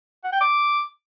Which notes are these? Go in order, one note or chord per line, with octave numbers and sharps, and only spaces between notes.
F#5
G5
D6